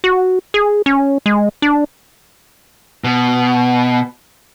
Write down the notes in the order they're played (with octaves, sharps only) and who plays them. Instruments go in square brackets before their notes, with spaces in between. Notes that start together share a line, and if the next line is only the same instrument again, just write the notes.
[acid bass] F#4
G#4
C#4
G#3
D4
[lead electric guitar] B2